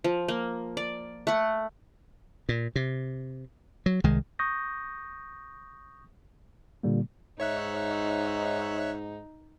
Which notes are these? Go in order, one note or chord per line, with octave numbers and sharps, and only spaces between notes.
F3
A#3
D5
A3 F#5
A#2
C3
F#3
C2 D#3 G#3
C#6 D#6 G6 A#6
A#2 D3 G3 A#3
G#2 D#4 C#5 E5 F#6